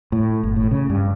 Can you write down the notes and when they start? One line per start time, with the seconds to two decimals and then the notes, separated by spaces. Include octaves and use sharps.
0.12 A2
0.43 G1
0.56 A2
0.71 C#3
0.90 G2